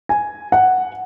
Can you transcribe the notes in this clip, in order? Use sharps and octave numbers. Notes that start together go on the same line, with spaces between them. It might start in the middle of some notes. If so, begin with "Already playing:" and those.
G#5
F#5